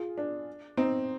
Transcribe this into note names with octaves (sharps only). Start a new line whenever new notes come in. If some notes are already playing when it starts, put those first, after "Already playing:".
Already playing: F4 G#4
D4
C4 D#4